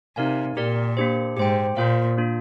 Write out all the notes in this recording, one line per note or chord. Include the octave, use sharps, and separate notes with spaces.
C3 D#4 A#4 D5 F5 G#5
A#2 G4 A#4 D5
A#3 D4 G4 C5
G#2 G4 C5 G5
A#2 A#3 F4 C5 F5
A#3 D4 F4